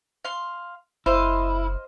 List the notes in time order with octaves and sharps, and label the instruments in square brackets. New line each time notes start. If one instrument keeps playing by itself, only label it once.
[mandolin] F5 C6
[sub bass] F#1 [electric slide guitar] E4 [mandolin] C5 D#5 F5